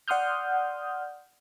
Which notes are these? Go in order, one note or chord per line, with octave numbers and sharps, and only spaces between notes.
D5 F#5 C6 D#6 F6 G6